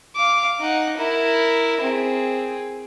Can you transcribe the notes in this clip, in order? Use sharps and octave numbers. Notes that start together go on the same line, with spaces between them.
F5 D6
D#4 F#5
E4 A#4
C4 G#4